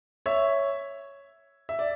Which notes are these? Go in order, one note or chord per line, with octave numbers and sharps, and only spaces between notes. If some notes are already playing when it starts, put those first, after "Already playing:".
C#5 E5
E5
D5